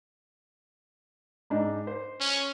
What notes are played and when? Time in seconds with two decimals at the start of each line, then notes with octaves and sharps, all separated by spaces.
1.50 G#2 D4 D#4
1.87 C5
2.20 C#4